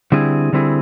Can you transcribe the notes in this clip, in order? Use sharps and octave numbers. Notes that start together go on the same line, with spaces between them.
D3 G3 C4 E4 G#4
D3 G3 C4 E4 G#4